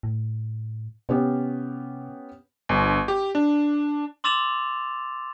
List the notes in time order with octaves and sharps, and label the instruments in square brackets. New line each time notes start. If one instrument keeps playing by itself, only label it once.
[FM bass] A2
[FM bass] C3 [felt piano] B3 C#4 G4
[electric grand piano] G1
G4
D4
[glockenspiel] C6 D6 E6 A6 E7 F7